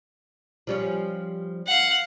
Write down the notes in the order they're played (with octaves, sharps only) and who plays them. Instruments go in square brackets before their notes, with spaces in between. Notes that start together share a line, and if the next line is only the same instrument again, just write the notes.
[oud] F3 G3 C#4
[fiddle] F5 F#5